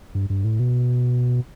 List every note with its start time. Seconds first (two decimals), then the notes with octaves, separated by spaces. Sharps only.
0.15 G2
0.30 G2
0.44 A2
0.60 B2